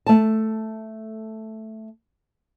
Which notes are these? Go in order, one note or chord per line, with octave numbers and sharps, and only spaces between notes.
A3 A5